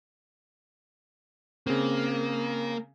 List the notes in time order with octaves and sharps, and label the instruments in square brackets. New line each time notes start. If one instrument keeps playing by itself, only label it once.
[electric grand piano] C#3 C4 [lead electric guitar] A#3